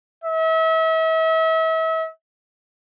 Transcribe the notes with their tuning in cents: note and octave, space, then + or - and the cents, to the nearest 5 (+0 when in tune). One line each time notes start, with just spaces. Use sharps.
E5 -35